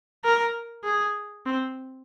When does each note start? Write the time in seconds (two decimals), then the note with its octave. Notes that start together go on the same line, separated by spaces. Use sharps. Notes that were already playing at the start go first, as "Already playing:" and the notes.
0.24 A#4
0.84 G#4
1.46 C4